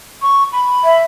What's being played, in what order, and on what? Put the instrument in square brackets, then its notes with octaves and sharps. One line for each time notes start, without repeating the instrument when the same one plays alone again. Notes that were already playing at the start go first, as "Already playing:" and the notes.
[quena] C#6
B5
[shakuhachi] E5